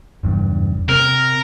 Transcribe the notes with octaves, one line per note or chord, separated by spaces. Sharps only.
F#1 E2 G2
C3 A#4